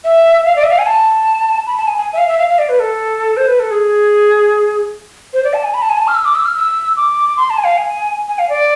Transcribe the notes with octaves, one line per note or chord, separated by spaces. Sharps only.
E5
F5
D5
E5
F5
G#5
A5
B5
A5
G#5
G#5
E5
F5
E5
F5
F5
D5
B4
A4
C5
B4
A4
G#4
C5
D5
A5
G#5
B5
A5
G#5
A5
F6
E6
D6
E6
F6
E6
D6
C6
A5
G#5
F5
G#5
G#5
F5
D5